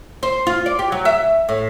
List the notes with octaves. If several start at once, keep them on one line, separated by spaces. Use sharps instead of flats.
C5
F4
D5
G4
F#3
E5
A2